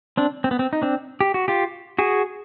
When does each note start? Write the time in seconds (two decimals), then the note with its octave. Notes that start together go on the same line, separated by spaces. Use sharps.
0.17 C4 D4
0.44 C4
0.51 B3
0.59 C4
0.73 D#4
0.82 C4 D4
1.21 G4
1.34 F#4
1.48 F4 G4
1.98 F#4 G#4